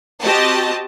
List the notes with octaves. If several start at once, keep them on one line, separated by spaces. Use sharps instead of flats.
C4 F#4 G4 D#5 A5